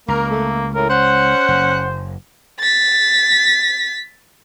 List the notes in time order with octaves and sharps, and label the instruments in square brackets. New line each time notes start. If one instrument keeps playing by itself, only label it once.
[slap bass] C#2 [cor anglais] A#3 [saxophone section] A#4
[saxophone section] A3
[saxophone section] A2 [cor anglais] A#4
[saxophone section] C#4 F#5 [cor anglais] C5
[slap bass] F#1
[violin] A6 B6